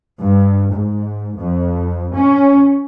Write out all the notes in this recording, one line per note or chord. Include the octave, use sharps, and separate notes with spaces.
G2
G#2
F2
C#4